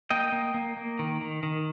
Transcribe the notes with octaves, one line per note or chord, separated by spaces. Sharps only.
A#3 D#5 G5
A#3
A#3
A#3
D#3
D#3
D#3